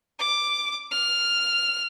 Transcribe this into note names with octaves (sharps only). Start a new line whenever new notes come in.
D6
F6